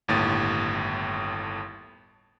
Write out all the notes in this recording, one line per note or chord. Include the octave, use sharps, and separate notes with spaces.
G1 D#2 A2 A6